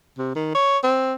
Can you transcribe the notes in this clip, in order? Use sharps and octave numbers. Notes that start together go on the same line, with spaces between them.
C3
D#3
C#5
C4